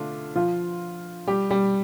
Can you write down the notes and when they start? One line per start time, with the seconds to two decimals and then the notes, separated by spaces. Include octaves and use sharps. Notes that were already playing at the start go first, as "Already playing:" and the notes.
Already playing: D3 A3 D4 F4
0.35 F3 F4
1.27 G3 G4
1.50 G3 G4